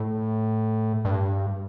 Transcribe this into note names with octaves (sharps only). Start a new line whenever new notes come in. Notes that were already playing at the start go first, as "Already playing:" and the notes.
Already playing: A2
G2